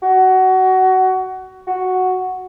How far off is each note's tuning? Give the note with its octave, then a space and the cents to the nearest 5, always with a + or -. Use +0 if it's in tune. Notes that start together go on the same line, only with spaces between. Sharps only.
F#4 +20
F#4 +0